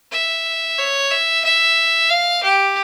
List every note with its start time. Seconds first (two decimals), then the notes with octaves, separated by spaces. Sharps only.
0.12 E5
0.78 C#5
1.11 E5
1.44 E5
2.10 F5
2.43 G4